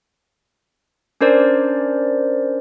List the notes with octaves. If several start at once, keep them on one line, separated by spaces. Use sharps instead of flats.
C#4 D4 A#4 C5 D5